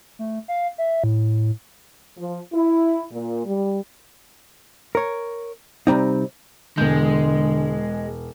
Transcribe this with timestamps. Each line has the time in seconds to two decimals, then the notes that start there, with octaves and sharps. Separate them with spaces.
0.19 A3
0.48 F5
0.78 E5
1.04 A2
2.17 F3
2.53 E4
3.12 A#2
3.45 G3
4.95 A#4 C#5
5.87 C3 G3 C4 D#4
6.78 E1 D3 G#3 G6